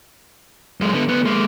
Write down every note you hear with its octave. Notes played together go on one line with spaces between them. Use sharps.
F#2 G#3
D3 B3
D2 B3
G#3 A#3